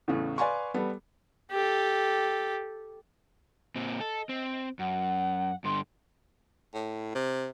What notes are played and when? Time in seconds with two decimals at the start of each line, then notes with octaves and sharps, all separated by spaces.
0.08 E2 A2 C#3
0.38 B4 D5 F5 G#5 C6 C#6
0.74 G3 B3 A4
1.51 G4 A4
3.76 A#2 C4 D#5
4.00 A4
4.29 C4
4.79 F#2 F#5
5.64 G2 D3 C6
6.74 A2
7.15 C3